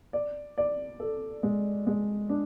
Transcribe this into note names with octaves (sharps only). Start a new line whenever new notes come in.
D5
D5
A4
G#3
G#3
D4